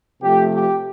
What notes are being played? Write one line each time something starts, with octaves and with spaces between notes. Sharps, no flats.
C3 F3 A3 G4
G4